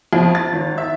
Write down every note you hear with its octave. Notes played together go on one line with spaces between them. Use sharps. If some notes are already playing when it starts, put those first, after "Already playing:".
F2
A6
G#1
E5